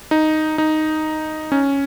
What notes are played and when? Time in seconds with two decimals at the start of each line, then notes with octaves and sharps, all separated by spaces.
0.11 D#4
0.58 D#4
1.52 C#4